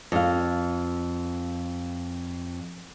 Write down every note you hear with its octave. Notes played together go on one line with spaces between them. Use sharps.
F2 F5